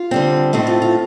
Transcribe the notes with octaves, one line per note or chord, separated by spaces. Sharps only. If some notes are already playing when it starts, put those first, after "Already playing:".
Already playing: F4
D3 G3 C4
A2 A3 C4 D#4
F4
F4